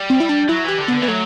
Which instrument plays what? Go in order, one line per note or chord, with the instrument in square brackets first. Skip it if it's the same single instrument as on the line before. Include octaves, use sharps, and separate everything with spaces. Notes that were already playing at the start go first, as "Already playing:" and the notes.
Already playing: [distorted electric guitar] G3
[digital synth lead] C4
E4
D4
[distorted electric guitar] F#3 [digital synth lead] E4
[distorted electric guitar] E3 [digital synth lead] G4
[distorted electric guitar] D3
[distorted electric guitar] D3 [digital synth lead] B3
[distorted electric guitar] E3 [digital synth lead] B3
[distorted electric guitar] F#3 [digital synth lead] A3